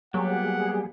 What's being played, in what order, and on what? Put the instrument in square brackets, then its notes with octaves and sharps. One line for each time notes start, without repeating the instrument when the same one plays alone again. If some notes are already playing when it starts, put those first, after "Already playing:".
[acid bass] F#3 [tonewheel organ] G3 G#4 [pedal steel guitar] A#3 B3 G4 [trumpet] F#5